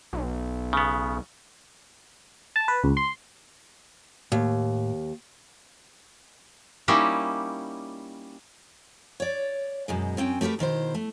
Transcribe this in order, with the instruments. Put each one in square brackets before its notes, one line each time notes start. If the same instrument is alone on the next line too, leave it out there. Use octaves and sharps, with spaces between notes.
[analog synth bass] B1
[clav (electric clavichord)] C#3 B3
[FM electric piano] A5
B4
C#2
C6
[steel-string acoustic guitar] D#2 [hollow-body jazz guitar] A2
[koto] G3 A#3 C#4 D#4 E4 G4
[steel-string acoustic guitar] C#5 D5
F#2 B2 G#3
F#2 C4 C#4 G5
A3 G4 G#4 A#4 B4
B2 D#3 E4 C5
A3